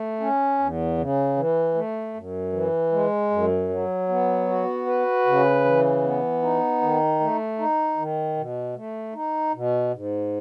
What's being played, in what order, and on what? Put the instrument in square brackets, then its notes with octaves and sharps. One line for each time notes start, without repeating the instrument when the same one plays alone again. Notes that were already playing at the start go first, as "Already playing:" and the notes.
Already playing: [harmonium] A3
C#4
E2
C#3
E3
A3
F#2
E3
G#3
F#2
F#3
B3
F#4
B4
C#3
E3
B3
D#4
D#3
A3
D#4
D#3
B2
A3
D#4
B2
G#2